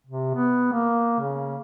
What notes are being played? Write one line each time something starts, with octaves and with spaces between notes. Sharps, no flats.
C3
B3
A#3
C#3